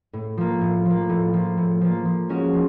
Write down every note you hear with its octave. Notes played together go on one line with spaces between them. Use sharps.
A2
F3 A#3
A2
F3 A#3
A2
F3 A#3
A2
F3 A#3
F3
G#3 C#4 F#4
F3